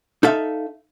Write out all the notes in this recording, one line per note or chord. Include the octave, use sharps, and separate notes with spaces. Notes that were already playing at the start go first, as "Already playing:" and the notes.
D#4 A4 E5 F5